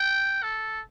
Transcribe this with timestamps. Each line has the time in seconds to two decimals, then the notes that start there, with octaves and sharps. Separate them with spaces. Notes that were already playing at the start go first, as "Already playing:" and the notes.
Already playing: G5
0.43 A4